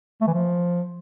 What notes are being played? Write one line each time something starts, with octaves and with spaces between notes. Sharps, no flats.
A3
E3
F3